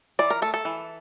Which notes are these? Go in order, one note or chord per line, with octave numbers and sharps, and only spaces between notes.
E3 D5
A#4
A3 A4
A4
E3